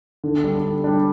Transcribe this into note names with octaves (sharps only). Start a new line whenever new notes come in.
D3
G3 D4
D3
G3 D4